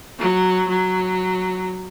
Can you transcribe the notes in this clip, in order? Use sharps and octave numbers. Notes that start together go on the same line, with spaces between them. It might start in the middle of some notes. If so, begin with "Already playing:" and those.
F#3
F#3